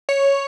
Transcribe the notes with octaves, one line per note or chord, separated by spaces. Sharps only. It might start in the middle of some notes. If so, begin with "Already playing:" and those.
C#5